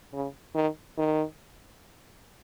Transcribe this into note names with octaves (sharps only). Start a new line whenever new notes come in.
C#3
D#3
D#3